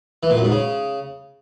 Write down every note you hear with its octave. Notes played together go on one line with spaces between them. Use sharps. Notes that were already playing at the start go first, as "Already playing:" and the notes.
E3
A#2
F#2
G#2
C#3